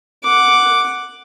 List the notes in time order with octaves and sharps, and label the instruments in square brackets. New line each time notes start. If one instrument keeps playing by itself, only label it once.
[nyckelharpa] F#5 D6